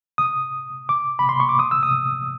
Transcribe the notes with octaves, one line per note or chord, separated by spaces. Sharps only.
D#6
D6
B5
C6
C#6
D6
D#6
E6
D#6